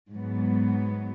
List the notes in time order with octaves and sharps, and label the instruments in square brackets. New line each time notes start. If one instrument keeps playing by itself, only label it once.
[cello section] G#2 F#3 B3